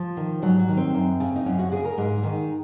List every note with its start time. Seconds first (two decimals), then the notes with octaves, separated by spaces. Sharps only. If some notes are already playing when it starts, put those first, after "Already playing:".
Already playing: F3
0.17 D#3
0.42 G#2 F#3
0.59 F#3
0.68 D#3
0.77 C4
0.95 F#2
1.20 C#3
1.36 D#4
1.46 F#2 C#4
1.59 F#4
1.72 C#3 G#4
1.84 A#4
1.98 G#2 G#4
2.23 D#3